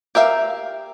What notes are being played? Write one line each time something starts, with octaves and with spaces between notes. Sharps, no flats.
G4 A#4 E5 F5